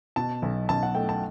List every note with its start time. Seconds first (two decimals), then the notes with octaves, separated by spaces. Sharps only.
0.16 B2 A5
0.42 B1
0.69 B1 A5
0.83 F#5
0.95 A3 G5
1.09 A5